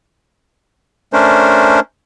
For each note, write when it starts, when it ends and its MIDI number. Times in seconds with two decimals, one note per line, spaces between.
1.13 1.80 57
1.13 1.80 61
1.13 1.80 62
1.13 1.80 70
1.13 1.80 72